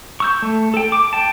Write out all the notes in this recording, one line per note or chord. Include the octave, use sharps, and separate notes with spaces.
C#6 E6 G6
A3
A4 G5
D6
G5 A5